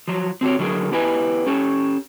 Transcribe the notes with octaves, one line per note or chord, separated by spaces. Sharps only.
F3 F#3
C4 F#4 G4 C#5
D3 F#3 E4 F#4 G#4 A#4
B3 E4 G4 B4 D#5 G#5
C#4 G4 A4